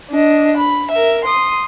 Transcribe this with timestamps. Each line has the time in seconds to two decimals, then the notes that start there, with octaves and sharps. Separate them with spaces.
0.11 D4 D#5
0.57 B5
0.91 A#4 E5
1.24 C6 D#6